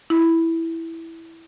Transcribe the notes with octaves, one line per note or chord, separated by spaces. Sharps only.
E4